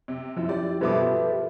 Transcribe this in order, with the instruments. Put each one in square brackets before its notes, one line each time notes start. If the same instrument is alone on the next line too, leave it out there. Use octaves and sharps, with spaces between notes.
[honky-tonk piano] C3
[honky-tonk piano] F#2 [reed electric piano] F3 E4
[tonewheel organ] G4 [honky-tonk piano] D5
[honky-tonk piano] G2 B2 D6 [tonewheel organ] G4 A4 B4 [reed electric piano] C5 E5
[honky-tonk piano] F3